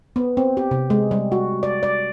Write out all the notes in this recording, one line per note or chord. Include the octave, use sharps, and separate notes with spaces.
B3
C4
G4
C3
G#3
G3
F#4
D5
D5